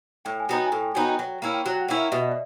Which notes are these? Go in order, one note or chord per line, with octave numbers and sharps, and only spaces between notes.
A2 G5
G#5
F#3 B3 D#4 G5
G#5
A2
G5
F#3 B3 D#4 G#5
G5
F#3
A#3 C#4 E4
G5
F#3 F#5
G5
F#5
A#3 C#4 E4
E5
B2 E5
D#5
D5